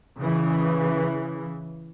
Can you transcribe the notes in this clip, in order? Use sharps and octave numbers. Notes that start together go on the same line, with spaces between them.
C#3 E3